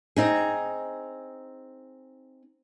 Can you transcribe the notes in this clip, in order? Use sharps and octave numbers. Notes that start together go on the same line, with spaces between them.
C4 D#4 G#4